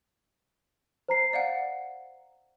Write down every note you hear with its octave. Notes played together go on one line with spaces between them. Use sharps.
C5 A#5 C7
D5 F5 F#5